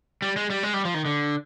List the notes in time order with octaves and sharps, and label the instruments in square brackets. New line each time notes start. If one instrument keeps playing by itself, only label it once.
[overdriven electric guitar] G3
G#3
G3
G#3
G3
F3
D#3
D3